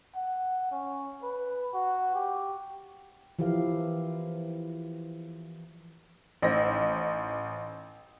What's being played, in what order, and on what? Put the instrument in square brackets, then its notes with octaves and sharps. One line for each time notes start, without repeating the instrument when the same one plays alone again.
[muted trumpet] F#5
C#4
B4
F#4
G4
[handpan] E3 F3 E4 G4 A#4 F5
[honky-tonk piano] A1 D#4 C5 A#6